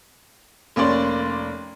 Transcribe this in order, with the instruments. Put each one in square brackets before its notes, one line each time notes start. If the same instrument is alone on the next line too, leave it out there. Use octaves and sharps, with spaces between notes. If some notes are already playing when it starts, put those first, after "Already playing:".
[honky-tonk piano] F1 A#3 C#4 D5 C6